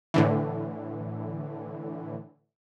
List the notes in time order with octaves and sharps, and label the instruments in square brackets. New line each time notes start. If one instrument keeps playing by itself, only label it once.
[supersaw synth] A2 D3 E3